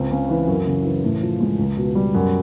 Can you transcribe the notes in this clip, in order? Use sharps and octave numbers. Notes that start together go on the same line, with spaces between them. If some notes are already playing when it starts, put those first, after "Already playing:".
Already playing: C#2 C4
C#3
E3
F#2
C#3
E3
A2
F3
G#3
C#2
B2
G3
F#2